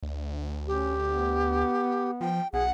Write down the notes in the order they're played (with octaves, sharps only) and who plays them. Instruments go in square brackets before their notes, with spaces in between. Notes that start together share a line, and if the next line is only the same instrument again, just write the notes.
[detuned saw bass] D2
[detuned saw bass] D2 [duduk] C#4 [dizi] G4
[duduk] B3
[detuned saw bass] F3 [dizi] G5
[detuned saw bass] B1 [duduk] G#4 [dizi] F#5